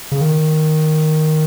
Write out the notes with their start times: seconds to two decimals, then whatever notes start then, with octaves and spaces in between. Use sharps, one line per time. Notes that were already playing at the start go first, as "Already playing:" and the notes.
0.12 C#3
0.21 D#3